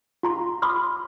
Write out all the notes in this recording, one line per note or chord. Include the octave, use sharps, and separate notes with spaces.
F4 A#5 C6
B5 C6 D6 D#6 F6